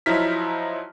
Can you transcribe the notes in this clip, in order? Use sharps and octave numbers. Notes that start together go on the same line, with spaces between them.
F3 F#3 D#4 E4 F6 B6